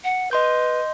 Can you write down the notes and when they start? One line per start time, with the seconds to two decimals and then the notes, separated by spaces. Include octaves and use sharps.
0.04 F#5
0.31 B4 D#5 C6 G6